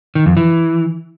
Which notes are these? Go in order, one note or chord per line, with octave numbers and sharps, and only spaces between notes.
D#3
F2
E3